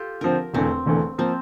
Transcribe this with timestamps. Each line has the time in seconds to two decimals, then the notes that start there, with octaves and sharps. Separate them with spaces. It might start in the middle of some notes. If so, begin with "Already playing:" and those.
Already playing: F4 G4 A4
0.21 D3 F3 C4 A#4
0.54 E1 E2 D3 A3 C4
0.86 E1 E2 D3 A3
1.18 F3 A#3 C4